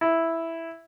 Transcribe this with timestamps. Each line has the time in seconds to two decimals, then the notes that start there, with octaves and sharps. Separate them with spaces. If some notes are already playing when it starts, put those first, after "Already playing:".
0.01 E4